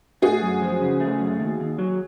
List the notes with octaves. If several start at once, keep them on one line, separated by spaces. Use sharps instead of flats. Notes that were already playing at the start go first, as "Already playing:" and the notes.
A3 F#4 G#4
F#2
F3
C#3
A3
F#2
D#2
D#2
F#3